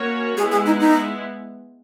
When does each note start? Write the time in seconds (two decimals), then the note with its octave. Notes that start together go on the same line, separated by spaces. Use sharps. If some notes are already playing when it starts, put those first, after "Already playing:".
Already playing: A#3 C#4 F#4 C#5
0.37 G#3 B3 E4 G#4
0.52 G#4
0.66 D#4
0.80 D#4